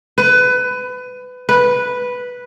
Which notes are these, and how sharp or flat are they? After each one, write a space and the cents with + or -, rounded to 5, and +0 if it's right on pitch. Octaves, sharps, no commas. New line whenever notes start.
B4 +25
B4 -5